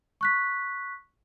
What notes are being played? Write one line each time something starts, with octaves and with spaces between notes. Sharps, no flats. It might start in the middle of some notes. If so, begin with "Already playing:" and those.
C#6 F#6 B6